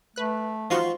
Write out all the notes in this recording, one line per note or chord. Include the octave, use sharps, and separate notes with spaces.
A3 B4 F#6
F3 D#4 F4 F#4 C6 C#6